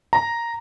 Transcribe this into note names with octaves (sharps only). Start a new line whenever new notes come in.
A#5